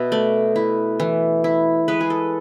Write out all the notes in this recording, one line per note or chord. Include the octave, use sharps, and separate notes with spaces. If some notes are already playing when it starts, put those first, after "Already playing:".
Already playing: B2 E5
A3 D5
E4
E3
E4
G#3 B4
G#4
A4